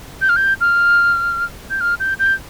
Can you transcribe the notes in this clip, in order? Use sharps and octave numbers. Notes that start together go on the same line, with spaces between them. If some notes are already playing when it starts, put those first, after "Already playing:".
G6
F6
G6
F6
G6
F6
G6
G6